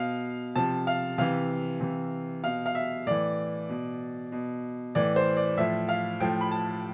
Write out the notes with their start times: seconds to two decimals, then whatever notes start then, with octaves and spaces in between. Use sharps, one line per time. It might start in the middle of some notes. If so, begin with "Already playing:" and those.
Already playing: B2 F5
0.55 C3 F3 A5
0.87 F5
1.18 C3 E3 F5
1.80 C3 E3
2.44 B2 F5
2.66 F5
2.75 E5
3.07 A2 E3 D5
3.69 B2
4.32 B2
4.95 A2 E3 D5
5.16 C5
5.37 D5
5.57 A2 F3 E5
5.89 F5
6.20 A2 F3 G5
6.41 B5
6.51 A5